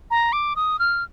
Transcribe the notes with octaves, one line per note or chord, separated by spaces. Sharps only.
A#5
D6
D#6
F6